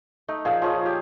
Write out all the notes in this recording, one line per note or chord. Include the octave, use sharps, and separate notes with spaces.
A3 D#4
A#2 F3 F4 G#4
F3 C#4 G#4 D#5
G4